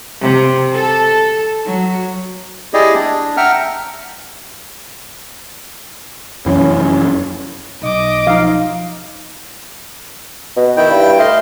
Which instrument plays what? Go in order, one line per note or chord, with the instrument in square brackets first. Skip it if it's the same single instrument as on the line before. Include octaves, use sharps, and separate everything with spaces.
[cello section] C3
A4
F#3
[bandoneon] E4 G4 G#4 D5 D#5
D4
E5 F#5 G5 A#5 F6
[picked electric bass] F1 F#2 E3 [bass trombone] C#4
[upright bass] B1 [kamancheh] D#5 D6
[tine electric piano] F3 D#4 [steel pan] F5
[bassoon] B2
[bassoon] D#3 [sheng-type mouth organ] E4 G5
[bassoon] G2
[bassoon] A3 [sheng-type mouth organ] D#5 F5 C6